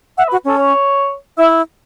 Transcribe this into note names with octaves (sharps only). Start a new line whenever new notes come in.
E5 F#5
B4
F#4
C#4 A4
C#5
E4 E5